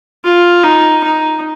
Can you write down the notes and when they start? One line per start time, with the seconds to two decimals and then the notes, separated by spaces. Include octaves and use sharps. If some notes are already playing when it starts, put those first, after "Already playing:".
0.24 F4
0.63 D#4
1.04 D#4